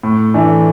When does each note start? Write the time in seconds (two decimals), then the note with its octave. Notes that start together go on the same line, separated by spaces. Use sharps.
0.03 A2
0.34 E3 A3 D4